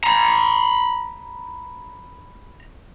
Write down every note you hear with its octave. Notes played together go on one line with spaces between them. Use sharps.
A#5 B5